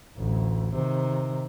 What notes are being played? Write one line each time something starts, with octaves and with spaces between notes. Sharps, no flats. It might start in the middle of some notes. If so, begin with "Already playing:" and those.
A1 D2
C3 D#3